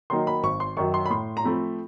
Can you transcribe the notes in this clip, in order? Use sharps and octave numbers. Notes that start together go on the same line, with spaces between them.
D#3 F#3 A#3 D#4 C6
B5
G#1 C#6
C6
F#2 D#3 F#3 C#6
C6
B5
A2 C6
A#5
F3 A3 C4 B5